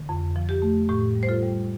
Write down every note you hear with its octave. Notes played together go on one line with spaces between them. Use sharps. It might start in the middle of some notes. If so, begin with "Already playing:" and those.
Already playing: D3
F2
F3
G4
A3
A2 G4
G3
C5
F4 A4
G3